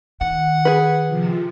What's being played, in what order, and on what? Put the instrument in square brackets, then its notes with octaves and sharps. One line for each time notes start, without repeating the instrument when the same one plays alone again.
[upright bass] D#3 [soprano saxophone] F#5
[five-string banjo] G#4 B4
[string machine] C3 F3